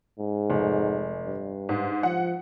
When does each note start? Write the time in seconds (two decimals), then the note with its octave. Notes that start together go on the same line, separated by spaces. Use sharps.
0.18 G#2
0.50 F1
1.25 G2
1.69 G#2
2.03 F3 F#5